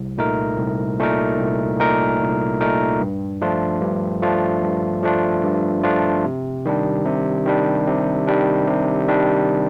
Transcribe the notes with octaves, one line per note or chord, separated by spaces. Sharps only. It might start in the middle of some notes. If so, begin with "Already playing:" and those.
Already playing: C2
A#2 A3 D#4 A#4
C2
A#2 A3 D#4 A#4
C2
A#2 A3 D#4 A#4
C2
A#2 A3 D#4 A#4
G2
F3 A3 D4 F4
G2
F3 A3 D4 F4
G2
F3 A3 D4 F4
G2
F3 A3 D4 F4
C3
D#3 G3 D4
C3
D#3 G3 D4
C3
D#3 G3 D4
C3
D#3 G3 D4